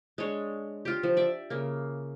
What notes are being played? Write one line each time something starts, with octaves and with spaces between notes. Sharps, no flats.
G#3 D4 C#5
F4 G4
F3
D5 E5
C#3 A#3